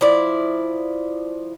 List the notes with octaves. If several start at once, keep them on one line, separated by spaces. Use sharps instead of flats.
F3 E4 D5